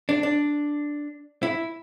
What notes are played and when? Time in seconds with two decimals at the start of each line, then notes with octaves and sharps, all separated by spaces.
0.09 D4
0.23 D4
1.43 E4